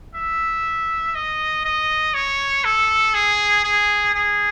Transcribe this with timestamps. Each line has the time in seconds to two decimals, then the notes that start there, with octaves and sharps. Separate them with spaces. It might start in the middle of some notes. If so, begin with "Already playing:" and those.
0.15 E5
1.15 D#5
1.65 D#5
2.14 C#5
2.65 A4
3.14 G#4
3.64 G#4
4.15 G#4